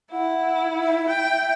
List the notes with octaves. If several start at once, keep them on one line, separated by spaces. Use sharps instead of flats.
E4 F#5
E5
G5